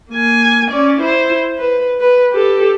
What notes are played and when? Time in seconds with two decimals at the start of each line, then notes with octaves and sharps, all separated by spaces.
0.10 A#3 G#5
0.71 C#4 D5
1.01 E4 C5
1.57 B4
2.00 B4
2.33 G4 A4